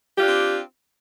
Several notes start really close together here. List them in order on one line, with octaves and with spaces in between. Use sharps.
G4 F4 D4 C4